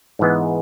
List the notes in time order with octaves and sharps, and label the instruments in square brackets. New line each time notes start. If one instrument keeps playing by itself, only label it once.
[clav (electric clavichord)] G#2 E3 G#3 B3